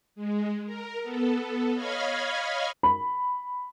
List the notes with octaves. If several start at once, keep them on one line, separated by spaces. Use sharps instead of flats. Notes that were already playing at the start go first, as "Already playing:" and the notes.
G#3
A#4
B3 A4
C#5 D#5 F5 B5 F6 G#6
B5